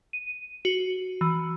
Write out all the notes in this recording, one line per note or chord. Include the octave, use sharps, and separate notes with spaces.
D#7
F#4
E3